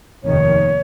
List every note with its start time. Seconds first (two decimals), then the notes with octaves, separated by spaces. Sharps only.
0.24 F1 D#2 D#3 C#5